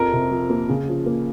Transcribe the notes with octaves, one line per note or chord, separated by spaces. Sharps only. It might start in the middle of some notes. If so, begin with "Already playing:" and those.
Already playing: F2 A#4
C3
F3
A#3
C#3
F3
A#3